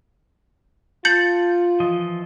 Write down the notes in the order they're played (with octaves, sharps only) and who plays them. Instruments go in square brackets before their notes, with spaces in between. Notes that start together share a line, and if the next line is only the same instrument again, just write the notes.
[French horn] F4 [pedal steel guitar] A5 [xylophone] G6 C#7 F#7
[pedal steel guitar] E3 F3 D#5